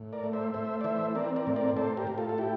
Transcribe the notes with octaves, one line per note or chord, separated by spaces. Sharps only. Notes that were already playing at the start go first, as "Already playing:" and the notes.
Already playing: A2
A#4 D5
A3
C5 E5
A3 C5 E5
D5
E3 C5 E5
C4 A#4 D5
A#4 D5
A2
A#4 D5
A2 A4 C5
G4 A#4
A2
F4 A4
A4
E4 G4